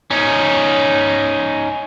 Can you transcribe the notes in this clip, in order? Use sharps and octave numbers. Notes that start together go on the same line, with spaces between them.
C#4 D#4